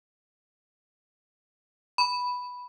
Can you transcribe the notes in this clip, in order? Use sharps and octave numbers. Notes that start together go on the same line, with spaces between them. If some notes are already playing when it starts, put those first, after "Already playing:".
B5